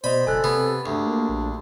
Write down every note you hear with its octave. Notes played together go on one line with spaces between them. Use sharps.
B2 C5 D5 D#5 B5
F#1 A4 G#5 F#6
C3 B3 G4
D2 G2 D4
A#3
A#1